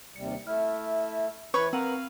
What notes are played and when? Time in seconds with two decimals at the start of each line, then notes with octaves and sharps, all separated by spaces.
0.16 D#2 C3 G3 C#7
0.47 A3 E4 F6
1.54 E3 B4 C#5 C#6
1.73 C4 A#4 B4 F5 F#5 A#5 D#7 F#7